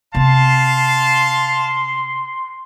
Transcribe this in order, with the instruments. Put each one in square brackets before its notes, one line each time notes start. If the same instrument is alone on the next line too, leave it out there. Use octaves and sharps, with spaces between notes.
[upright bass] C3 C4 [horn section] F5 A5 [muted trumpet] C6